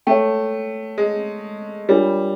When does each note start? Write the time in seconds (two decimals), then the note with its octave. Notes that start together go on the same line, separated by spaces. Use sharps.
0.07 A3 C#5 E5 G5
0.98 G#3
1.89 G3 D4 F4 A#4 C#5